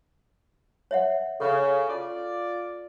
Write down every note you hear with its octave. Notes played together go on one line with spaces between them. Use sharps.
C#5 E5 F#5
C#3 A4
F4 D5